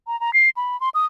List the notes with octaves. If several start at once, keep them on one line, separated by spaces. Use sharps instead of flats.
A#5
A#5
C7
B5
C6
D#6